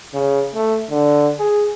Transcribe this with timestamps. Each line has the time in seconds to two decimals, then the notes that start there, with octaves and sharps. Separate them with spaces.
0.14 C#3
0.55 A3
0.91 D3
1.40 G#4